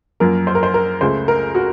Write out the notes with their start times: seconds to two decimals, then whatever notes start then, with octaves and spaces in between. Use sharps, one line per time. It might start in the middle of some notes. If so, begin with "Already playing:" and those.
0.20 F#2 F3 A#3 A#4
0.47 C5
0.55 A#4
0.63 C5
0.74 A#4
1.01 C#2 C#3 A3 C5
1.28 A#4
1.55 F#4